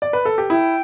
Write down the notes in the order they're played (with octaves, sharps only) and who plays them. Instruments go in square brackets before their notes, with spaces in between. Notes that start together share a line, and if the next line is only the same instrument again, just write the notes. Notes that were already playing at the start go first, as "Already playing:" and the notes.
[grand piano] D5
B4
A4
G4
[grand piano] E4 [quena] G5